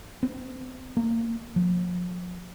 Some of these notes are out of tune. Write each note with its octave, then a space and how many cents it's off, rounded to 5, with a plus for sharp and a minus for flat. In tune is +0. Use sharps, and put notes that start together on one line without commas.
C4 -35
A#3 -25
F3 +40